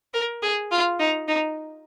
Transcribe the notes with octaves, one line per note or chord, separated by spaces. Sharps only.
A#4
G#4
F4
D#4
D#4